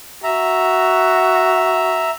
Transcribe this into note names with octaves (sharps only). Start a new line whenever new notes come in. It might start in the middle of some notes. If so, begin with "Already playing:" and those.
F#4 E5 A#5